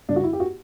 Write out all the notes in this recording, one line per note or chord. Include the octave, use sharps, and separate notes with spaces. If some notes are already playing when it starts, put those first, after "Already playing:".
C#3 G3 D4
F#4
E4
G4
F#4